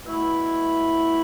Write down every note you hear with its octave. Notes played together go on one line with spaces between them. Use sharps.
B2 A3 E4